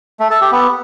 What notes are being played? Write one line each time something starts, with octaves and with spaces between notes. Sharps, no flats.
A3
A4
G4
B3